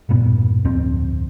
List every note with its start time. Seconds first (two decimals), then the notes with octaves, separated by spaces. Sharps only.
0.09 E1 G2 A#2 B3
0.65 D1 F2 C4